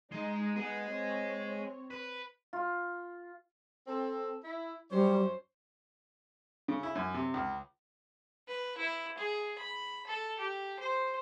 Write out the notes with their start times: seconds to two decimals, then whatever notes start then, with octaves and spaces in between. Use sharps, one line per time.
0.12 G#3 D#4
0.56 B3 G#4 D#5 F#5
0.89 C4 C#5
1.91 B4
2.53 F4
3.87 C4 A4
4.44 E4
4.91 F#2 G3 C5 C#5
6.68 C#3
6.83 E4
6.95 F#2
7.14 C3
7.34 C#2
8.48 B4
8.77 E4
9.18 G#4
9.59 B5
10.07 A4
10.39 G4
10.80 C5